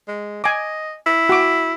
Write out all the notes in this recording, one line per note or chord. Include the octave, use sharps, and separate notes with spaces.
G#3
D#5 G#5 D6
E4
F#4 D6